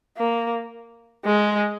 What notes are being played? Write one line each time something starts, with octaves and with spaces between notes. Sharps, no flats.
A#3
G#3